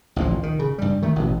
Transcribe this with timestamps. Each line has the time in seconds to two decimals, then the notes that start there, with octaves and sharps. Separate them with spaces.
0.16 A1 D2 A#2 F3
0.43 D#3
0.59 C#3
0.78 G2 G3
1.02 D#3 A3
1.16 A1 B2